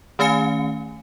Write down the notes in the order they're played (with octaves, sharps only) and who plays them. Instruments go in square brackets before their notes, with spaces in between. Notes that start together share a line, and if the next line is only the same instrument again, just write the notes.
[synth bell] D#3 A3 C#4 F5 G#5 C#7